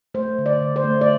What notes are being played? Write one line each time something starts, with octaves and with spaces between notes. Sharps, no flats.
A3 C5
D3
D5
D3
C5
A3
D5